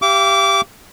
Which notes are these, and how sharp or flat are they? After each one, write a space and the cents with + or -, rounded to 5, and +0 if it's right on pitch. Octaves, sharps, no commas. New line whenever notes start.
G4 +0 F5 -35 D6 -25